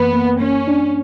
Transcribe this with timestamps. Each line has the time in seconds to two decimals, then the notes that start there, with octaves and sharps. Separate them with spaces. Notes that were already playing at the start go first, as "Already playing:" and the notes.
Already playing: F#2 E3 A#3 B3
0.13 A#3
0.41 A#3 C#4
0.68 D4